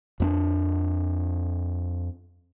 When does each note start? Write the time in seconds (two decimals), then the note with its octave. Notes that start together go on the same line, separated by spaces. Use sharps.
0.20 F2 A#3 D4